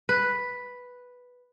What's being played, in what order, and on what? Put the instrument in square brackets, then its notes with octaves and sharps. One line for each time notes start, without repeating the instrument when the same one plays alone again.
[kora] B4